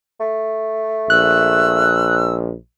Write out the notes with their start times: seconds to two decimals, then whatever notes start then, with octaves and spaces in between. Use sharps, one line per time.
0.20 A3
1.10 A#1 E6 F#6